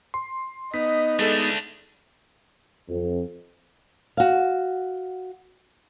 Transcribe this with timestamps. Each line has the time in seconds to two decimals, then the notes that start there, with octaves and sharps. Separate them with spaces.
0.14 C6
0.74 B3 D#4 D#5 B6
1.19 G#3 A3 D4 A4
2.89 F2
4.17 F#4 F5